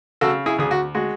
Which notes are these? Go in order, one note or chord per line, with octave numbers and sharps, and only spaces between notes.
C#3 F#4 A4
E4 G#4
D2 G#4
F#4
G#3 F#4